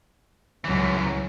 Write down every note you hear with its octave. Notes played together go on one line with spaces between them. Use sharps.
C#2 F#2 E3 F#3